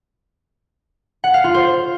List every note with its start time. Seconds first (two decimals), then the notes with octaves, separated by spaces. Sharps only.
1.24 F#5
1.34 F5
1.44 F4
1.54 C5